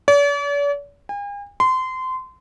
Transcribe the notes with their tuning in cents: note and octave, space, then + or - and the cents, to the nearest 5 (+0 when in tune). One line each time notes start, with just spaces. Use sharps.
D5 -45
G#5 -45
C6 -25